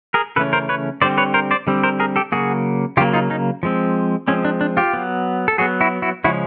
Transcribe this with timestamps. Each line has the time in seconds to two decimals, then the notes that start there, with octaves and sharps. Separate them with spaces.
0.14 G#4 A#4
0.36 C#3 E3 A3 C#4 A4 B4
0.53 A#4 C5
0.69 B4 C#5
1.02 D3 G3 C4 C5 D5
1.18 B4 C#5
1.34 A#4 C5
1.51 C5 D5
1.67 D3 G3 C4
1.83 A#4 C5
2.00 G#4 A#4
2.16 G4 A4
2.32 C#3 F#3 A#3 F#4 G#4
2.97 C#3 F#3 A#3 F4 G4
3.13 D#4 F4
3.30 C#4 D#4
3.63 F3 G#3 C4
4.28 F3 G#3 C4 C#4
4.45 D4
4.61 D4
4.77 F4 G4
4.93 F#3 B3
5.48 A4
5.58 F#3 B3 F#4 G#4
5.81 E4 F#4
6.02 E4 F#4
6.24 C#3 F3 G#3 C#4 E4 F#4